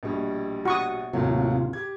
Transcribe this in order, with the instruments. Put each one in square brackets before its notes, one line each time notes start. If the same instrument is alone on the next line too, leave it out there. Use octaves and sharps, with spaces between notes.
[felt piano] A#1 B2 G3
[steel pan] F#4 C#6 D#6
[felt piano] D#2 A2 F#3 [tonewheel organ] C3 F4
[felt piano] G4 G#6